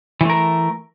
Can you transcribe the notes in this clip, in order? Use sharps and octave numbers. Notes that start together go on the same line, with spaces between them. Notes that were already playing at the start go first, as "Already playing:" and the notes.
E3 A3 A#4